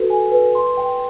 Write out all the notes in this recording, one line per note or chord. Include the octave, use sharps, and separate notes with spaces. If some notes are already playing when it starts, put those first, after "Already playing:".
Already playing: F#4 A4 B4
G#5
B4
C6
G5